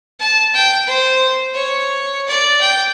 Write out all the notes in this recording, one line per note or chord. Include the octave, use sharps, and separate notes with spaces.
A5
G5
C5
C#5
D5
G5